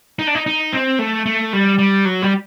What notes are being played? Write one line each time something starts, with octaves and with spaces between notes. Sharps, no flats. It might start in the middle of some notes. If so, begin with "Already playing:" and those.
D#4
D4
D#4
D#4
C4
A3
A3
G3
G3
F#3
G3